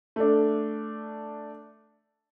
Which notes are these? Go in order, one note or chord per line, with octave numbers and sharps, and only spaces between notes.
A3 D4